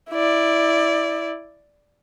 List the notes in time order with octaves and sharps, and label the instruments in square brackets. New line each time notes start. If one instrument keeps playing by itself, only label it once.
[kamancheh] E4 D5